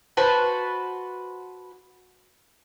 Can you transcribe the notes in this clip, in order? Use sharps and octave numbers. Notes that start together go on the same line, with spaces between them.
F#4 B4 C5 A5